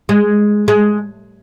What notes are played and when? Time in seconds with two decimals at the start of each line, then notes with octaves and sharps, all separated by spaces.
0.09 G#3
0.68 G#3